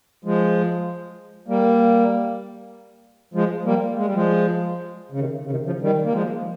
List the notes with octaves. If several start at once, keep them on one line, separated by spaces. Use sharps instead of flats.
F3 G#3
G3 A#3
F3 G#3
G3 A#3
G#3
G3
F3 G#3
C#3
C3 D#3
C#3
C3 D#3
C#3 F3
D#3 G3
A#3
F3 G#3